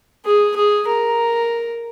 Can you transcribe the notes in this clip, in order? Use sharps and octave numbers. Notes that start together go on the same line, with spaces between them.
G#4
G#4
A#4